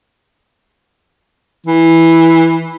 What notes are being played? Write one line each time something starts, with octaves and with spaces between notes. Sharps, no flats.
E3